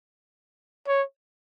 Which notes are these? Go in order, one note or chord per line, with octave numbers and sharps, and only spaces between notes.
C#5